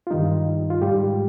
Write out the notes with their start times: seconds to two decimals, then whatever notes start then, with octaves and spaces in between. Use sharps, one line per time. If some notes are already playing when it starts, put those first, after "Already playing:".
0.07 F4
0.11 G2 D#3 G3 D#4
0.70 F4
0.82 G#2 G3 G4